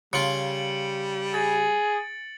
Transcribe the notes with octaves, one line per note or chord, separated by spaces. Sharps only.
C#3 G3 F4 C#7 D7 F#7
G#4 A6